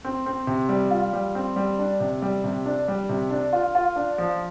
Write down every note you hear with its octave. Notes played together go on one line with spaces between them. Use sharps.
C4
C4
C3
G3
F4
G3
C4
G3
D4
C3
G3
C3
D4
G3
C3
D4
F4
F4
D4
F3